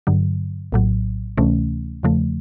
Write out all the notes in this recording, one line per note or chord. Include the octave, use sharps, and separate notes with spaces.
G2 D3 F#3
A#1 A2 F#3
D2 C3 E3 A3 C#4
E2 C#3 F3 A3